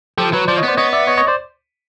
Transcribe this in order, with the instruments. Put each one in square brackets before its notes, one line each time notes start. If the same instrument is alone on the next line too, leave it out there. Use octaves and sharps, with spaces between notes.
[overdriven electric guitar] F3 [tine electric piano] G4 A4
[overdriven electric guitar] F#3 [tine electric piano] B4 C#5
[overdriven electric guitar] F3 [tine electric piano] C5 D5
[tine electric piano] C#5 D#5
[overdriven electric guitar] B3
[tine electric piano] C5 D5
[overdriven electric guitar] B3 [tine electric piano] C#5 D#5
[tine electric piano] D5 E5
C#5 D#5
C#5 D#5
C5 D5